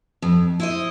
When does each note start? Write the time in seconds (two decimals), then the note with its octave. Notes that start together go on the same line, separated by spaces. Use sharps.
0.22 F2
0.60 E4 C5 D#5